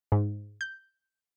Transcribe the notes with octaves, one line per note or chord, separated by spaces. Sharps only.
G#2
G6